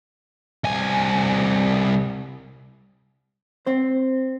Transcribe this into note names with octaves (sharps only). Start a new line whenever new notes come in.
C2 G#5
C4 C5